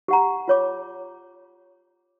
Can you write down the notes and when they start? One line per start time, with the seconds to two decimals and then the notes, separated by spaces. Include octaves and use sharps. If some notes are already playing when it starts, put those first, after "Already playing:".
0.08 G4 F#5 A#5
0.48 F4 C#5 D6